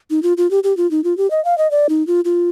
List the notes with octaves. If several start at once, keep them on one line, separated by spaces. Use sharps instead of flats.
D#4
F4
F4
G4
G4
F4
D#4
F4
G4
D#5
F5
D#5
D5
D#4
F4
F4